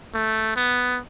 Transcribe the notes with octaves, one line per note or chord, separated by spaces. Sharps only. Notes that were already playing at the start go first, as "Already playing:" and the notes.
A3
B3